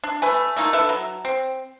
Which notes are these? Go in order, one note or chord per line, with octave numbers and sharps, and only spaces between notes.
D4
A3 B4 G#5
A3 A#3 D#4 F4
D4 A4 B4 E5
F#3
C4